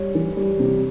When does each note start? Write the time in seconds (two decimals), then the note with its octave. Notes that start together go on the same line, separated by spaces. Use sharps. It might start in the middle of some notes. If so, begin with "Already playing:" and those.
Already playing: G3 C#5
0.15 E3
0.37 G3
0.60 C3